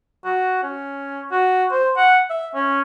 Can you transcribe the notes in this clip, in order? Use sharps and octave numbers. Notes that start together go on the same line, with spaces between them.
F#4
C#4
F#4
C5
F#5
E5
C#4